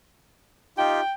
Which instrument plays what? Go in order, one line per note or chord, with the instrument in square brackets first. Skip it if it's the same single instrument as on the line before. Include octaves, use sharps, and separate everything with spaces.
[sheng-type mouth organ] D#4 F4 G4 [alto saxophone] G5